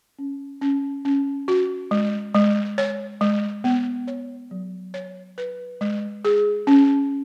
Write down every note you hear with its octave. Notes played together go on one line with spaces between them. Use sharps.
C#4
C#4
C#4
F#4
G#3
G#3
C#5
G#3
B3
C#5
F#3
C#5
B4
G#3
G#4
C#4